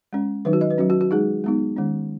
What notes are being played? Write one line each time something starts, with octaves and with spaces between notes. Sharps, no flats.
G#3 C#4
D#3 F#3 D#4 B4
F#4
D#5
B4
F#3 C#4 F#4
F#4
F#4
G#3 D#4 G#4
G#3 B3 D#4
D#3 G#3 C#4